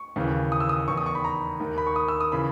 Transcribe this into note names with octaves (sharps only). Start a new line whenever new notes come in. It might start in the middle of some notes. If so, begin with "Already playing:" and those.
Already playing: C#6
D#2 C#3 E3
D#6
E6
D#6
E2 D#3 C#6
D#6
C#6
B5
A#5
D#2 D#3
B5
C#6
D#6
E6
D#6
C#3 E3 B5